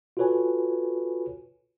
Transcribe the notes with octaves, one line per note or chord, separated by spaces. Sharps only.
F4 F#4 A4 B4 C#5 G#5